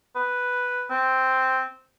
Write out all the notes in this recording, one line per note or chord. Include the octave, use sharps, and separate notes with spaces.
B4
C4